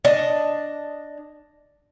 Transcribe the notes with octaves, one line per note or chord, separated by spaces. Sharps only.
D4 D#5